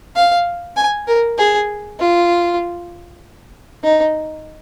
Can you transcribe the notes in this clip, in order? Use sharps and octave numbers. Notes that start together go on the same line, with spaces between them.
F5
G#5
A#4
G#4
F4
D#4